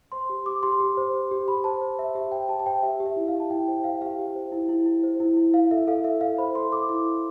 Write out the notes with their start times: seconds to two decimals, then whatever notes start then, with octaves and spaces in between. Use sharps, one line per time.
0.12 C5 C6
0.30 G4
0.46 G4 D6
0.63 G4 C6
0.80 G4
0.97 C5
1.14 G4
1.31 G4
1.48 G4 B5
1.64 C5 A5
1.81 C5
1.99 C5 E5
2.15 G4 E5
2.32 C5 G5
2.49 G4 A5
2.59 A5
2.66 C5 G5
2.83 G4 E5
3.00 G4
3.06 E5
3.16 E4
3.28 F5
3.34 G4
3.40 A5
3.50 E4 G5
3.68 C5 G5
3.84 C5 F5
4.02 G4 F5
4.19 G4
4.36 C5
4.52 E4
4.69 E4
4.86 E4
5.03 C5
5.20 E4
5.37 E4
5.53 E4 F5
5.71 A4 E5
5.87 A4 F5
6.04 A4 E5
6.21 A4 F5
6.38 C5 B5
6.55 A4 C6
6.72 A4 D6
6.89 E4 D6
7.06 E4